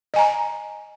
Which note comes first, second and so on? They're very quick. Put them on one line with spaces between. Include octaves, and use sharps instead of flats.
D#5 G#5 A#5